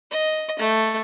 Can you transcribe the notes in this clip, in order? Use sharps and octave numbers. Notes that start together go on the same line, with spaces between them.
D#5
A3